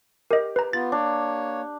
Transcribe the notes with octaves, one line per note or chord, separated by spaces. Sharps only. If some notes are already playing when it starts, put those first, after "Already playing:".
G4 A#4 D#5
B4 A#5
B3 F4 A6
A#3 D4 C#5